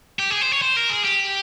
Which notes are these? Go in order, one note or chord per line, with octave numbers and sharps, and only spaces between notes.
G4
G#4
C5
C#5
C5
A#4
G#4
G4